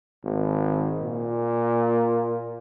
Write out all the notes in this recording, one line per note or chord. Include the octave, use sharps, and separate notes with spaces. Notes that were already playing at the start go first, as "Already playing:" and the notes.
G#1
A#2